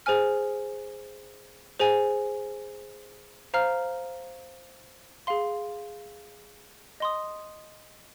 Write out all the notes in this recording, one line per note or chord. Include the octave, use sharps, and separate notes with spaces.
G#4 C5 G#5 F6
G#4 C5 G#5
C5 F5 A#5 F6
G#4 F5 C6
D#5 C6 D#6